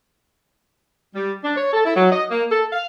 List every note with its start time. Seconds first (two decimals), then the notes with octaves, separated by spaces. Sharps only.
1.14 G3
1.43 D4
1.56 C#5
1.73 A4
1.85 E4
1.96 F#3
2.11 D#5
2.29 A#3
2.50 A4
2.73 F5